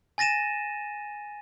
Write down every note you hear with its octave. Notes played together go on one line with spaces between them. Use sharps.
G#5 A6 A#6 D#7 E7